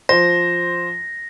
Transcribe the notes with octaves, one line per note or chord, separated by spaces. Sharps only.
F3 C5 A#6